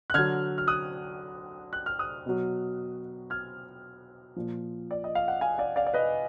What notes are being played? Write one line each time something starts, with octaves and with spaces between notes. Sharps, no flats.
F#6
D3 F#3 F6 G#6
F6
D#6 F#6
F#6
F6
D#6 F#6
B2 F#3
F6 G#6
A#2 F3
D5
D#5
F5
F#5
F5 G#5
D5 F5
D5 F5
D5
B4 D#5